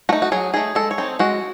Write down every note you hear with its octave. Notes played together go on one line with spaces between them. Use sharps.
A3 D#4 F#4
F#4
F#3 G#4
A3 D#4 G#4
G#3 A4
C#5
C4 D#4
G#3 F#4